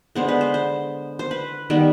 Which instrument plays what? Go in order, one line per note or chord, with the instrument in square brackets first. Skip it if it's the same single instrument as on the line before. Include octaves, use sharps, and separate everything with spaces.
[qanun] D3 G#3 B3 C5
B4
C5
C5
C5
B4
D#3 G3 B3